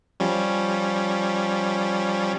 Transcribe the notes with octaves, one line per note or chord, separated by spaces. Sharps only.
F3 G3 C#4